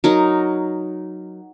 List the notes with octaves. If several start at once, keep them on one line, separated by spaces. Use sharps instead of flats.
F#3 D#4 A#4